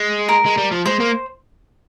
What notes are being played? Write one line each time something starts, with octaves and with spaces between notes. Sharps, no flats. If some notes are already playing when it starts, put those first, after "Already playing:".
Already playing: G#3
A#4
G#3
G3
F3
G#3 C5
A#3